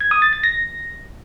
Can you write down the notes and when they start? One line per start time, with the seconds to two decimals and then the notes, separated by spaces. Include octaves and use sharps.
0.01 G#6
0.11 D#6
0.22 A6
0.33 A6
0.44 A#6